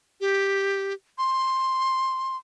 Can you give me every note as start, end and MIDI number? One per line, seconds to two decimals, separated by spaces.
0.21 0.93 67
1.18 2.37 84